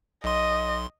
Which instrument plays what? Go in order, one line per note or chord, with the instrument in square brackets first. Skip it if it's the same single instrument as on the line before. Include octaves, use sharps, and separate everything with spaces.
[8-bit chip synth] B1 C6 [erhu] D#5